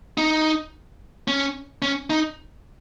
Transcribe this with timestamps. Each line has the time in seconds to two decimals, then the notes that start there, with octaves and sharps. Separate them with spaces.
0.18 D#4
1.28 C#4
1.82 C#4
2.10 D#4